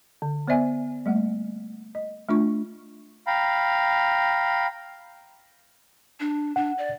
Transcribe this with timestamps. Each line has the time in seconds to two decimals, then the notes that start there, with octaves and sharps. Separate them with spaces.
0.22 D3
0.48 B3 C5 D5 E5 G#5
1.06 G3 A3 A#3 F#5
1.95 D#5
2.29 A3 D4 F4 C#6
3.27 F5 G5 A#5 B5
6.20 D4
6.56 D4 F#5
6.78 D5